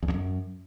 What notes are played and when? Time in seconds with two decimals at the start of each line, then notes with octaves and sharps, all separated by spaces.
0.03 E2
0.08 F2
0.14 F#2